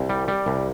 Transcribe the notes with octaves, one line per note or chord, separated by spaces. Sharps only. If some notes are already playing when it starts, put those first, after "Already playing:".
Already playing: C2
G3
G3
C2